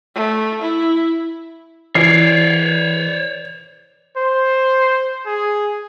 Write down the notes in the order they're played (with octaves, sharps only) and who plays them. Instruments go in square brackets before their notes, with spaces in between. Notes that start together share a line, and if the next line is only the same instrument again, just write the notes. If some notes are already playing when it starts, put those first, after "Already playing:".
[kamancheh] A3
E4
[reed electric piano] E3 [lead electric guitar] C#5 D5 [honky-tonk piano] C7
[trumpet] C5
G#4